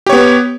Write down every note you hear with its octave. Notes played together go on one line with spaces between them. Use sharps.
B3 G4 C#5